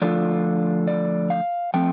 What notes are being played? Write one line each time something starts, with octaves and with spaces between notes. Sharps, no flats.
D3 F3 A3 D4 F4 D5
D5
F5
F3 A3 C4 G5